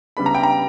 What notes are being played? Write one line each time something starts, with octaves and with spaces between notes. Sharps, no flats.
C#3 G3 B3 D4 B5
A#5
G5
A#5